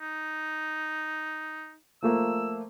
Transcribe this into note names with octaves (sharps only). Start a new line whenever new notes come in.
D#4
F3 A3 A#3 E6